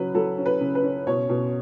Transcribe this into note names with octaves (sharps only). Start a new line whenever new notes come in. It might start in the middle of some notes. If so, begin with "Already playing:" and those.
Already playing: C#3 F#3 B4
F#3 A4
C#4
B4
C#3
B4
C#4
B2 C#5
B2